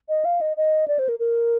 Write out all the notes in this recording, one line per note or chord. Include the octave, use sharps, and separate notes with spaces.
D#5
F5
D#5
D#5
D5
C5
A#4
A#4